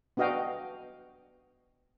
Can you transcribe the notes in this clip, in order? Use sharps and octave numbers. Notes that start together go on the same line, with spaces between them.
B3 D4 F#4 D#5 F5 G5